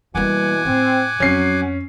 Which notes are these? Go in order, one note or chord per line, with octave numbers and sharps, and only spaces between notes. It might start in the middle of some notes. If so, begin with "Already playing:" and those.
G2 B2 E3 G3 A#3 F#5 G#5 D6
A2 C4 D4
F2 F#3 C#4 C7